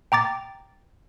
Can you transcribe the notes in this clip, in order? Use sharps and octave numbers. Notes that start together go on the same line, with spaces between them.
G5 A#5 D6 A6